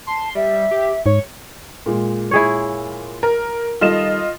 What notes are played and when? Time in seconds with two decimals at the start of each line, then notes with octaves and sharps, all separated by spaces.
0.07 A5 C6
0.35 G3 E5
0.71 G4
1.06 G#2 C#5
1.86 A#2 G#3
2.31 E4 G#4 C#5
3.23 A#4
3.81 D#3 G3 F4 A4 D#5 E7